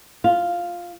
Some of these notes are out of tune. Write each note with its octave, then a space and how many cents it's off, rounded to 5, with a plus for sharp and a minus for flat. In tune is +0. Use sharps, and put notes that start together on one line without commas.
F4 +0 F5 +0